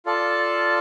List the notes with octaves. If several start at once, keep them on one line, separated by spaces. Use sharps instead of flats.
F4 A4 D5 A5